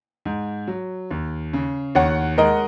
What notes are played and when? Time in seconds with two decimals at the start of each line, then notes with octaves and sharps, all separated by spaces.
0.25 G#2
0.67 F#3
1.11 D#2
1.53 C#3
1.95 D#2 C#5 F#5
2.38 G#3 A#4 D#5